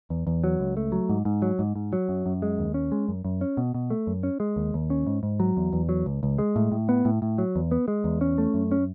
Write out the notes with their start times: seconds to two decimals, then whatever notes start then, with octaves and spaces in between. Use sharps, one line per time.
0.10 E2
0.27 E2
0.44 F#3
0.60 C#2
0.77 A3
0.92 F#3
1.09 G#2
1.25 G#2
1.42 F#3
1.59 G#2
1.76 G#2
1.93 F#3
2.09 F#2
2.26 F#2
2.42 G#3
2.59 D#2
2.74 C#4
2.92 G#3
3.08 F#2
3.25 F#2
3.41 C#4
3.57 B2
3.74 B2
3.90 A3
4.07 F#2
4.23 C#4
4.40 G#3
4.56 D#2
4.74 D#2
4.90 C#4
5.07 G#2
5.23 G#2
5.40 F#3
5.57 E2
5.73 E2
5.89 F#3
6.06 C#2
6.23 C#2
6.39 G#3
6.56 A2
6.72 A2
6.89 B3
7.05 A2
7.22 A2
7.38 F#3
7.56 E2
7.71 B3
7.88 G#3
8.04 E2
8.21 C#4
8.38 A3
8.54 F#2
8.72 C#4